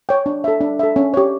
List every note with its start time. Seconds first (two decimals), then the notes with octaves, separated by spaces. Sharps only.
0.09 C#5 G5
0.26 D4
0.44 A4 E5
0.61 D4
0.79 A4 E5
0.96 C#4
1.14 G4 C#5